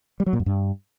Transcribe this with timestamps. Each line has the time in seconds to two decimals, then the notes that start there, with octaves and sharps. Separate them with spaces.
0.20 G3
0.26 F#3
0.33 A#2
0.40 F#2
0.46 G2